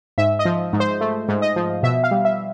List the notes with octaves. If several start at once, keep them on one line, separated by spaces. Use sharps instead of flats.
G#2 E5
D#5
F3
G#2
C5
A3
G#2
D#5
F3
B2 E5
F5
G3
E5